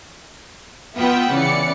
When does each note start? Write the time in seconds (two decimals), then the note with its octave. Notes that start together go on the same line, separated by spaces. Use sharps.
0.98 B3 F4 E5 F#5 G5
1.32 C#3 E3 D5 C#7